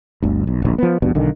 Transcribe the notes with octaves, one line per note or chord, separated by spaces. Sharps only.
G1 D2
B1
D1 A#1
F3 B3
A#1 E2 G2 B2
B1 D3 D#3